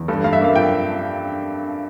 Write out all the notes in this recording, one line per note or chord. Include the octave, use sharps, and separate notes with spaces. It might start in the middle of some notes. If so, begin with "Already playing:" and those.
Already playing: E2
G2 A4
G2 F5
E5
A#3 F5
F3 G5